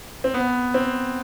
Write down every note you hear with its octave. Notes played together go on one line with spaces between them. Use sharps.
C4
B3
C4